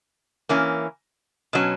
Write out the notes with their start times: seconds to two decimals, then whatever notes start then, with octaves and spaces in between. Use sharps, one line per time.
0.49 E3 A#3 C#4
1.53 B2 F#3 C#4